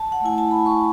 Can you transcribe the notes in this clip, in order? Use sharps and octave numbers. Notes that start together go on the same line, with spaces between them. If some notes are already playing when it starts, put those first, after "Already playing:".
Already playing: A5
F#5
A3 E4 G#5
A5
B5
C#6